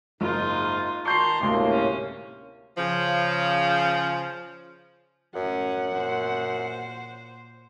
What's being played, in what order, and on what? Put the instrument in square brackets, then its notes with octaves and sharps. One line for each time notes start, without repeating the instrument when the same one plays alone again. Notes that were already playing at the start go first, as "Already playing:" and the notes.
[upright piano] F#1 [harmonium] G#2 [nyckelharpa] D#4 F4
[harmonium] D#3 A5 A#5 [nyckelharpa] C6 [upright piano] C#6 G6 C7
[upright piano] G#1 D2 [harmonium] A2 C3 A#3
[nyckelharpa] C#4
[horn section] C#3 F3
[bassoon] F#2 [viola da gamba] A2 C#4 [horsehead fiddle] F#5
[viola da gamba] A#2 C5